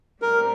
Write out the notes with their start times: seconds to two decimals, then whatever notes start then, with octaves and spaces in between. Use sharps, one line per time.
0.22 A2 G3 C4 G4 A#4